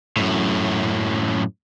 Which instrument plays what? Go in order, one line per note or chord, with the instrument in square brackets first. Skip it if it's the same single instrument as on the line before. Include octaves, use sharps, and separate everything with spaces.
[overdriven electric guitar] F#2 A2